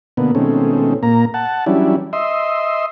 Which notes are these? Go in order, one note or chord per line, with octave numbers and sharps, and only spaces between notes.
B2 D3 A#3 B3
B2 D#3 G#3 A3 C4 C#4
A#2 A#3 A#5
F#5 A5
E3 F#3 G3 C#4 D4 E4
D#5 E5 C6